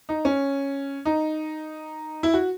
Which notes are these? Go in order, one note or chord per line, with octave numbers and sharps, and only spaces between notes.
D#4
C#4
D#4
E4
F#4